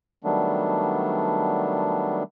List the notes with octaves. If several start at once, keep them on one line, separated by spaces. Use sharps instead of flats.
D#3 F#3 G3 A3 B3 D4